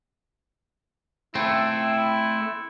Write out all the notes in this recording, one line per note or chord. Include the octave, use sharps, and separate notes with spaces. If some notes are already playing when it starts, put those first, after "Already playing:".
A3 C4 E4